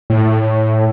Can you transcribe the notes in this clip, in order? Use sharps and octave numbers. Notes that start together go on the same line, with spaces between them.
A2